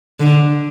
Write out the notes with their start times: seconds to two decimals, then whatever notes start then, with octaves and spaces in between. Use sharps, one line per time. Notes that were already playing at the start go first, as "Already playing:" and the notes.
0.20 D3